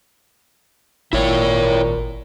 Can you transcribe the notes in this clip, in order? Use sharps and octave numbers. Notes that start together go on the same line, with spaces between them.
G#1 A#2 E4 C#5